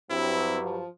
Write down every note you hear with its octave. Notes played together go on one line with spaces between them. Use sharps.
G2 F#3 C4 E4
F3